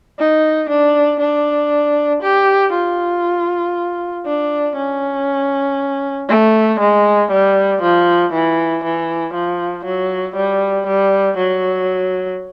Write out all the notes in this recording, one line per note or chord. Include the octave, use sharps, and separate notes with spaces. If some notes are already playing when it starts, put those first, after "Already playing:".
D#4
D4
D4
G4
F4
D4
C#4
A3
G#3
G3
F3
E3
E3
F3
F#3
G3
G3
F#3